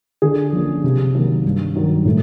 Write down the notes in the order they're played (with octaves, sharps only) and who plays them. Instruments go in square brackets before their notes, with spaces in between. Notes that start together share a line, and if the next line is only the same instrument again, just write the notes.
[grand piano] D3 G#4
F3 A#3 C#4
C3
D#3 F#3 A#3
G2
D#3 F#3
A2